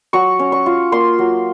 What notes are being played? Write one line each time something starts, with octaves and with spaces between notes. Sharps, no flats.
F#3 C#6
C#4
C#6
F4
A#3 C6
F#3